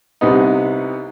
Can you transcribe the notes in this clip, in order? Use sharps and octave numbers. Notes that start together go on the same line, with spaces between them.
C2 C3 B3 D#4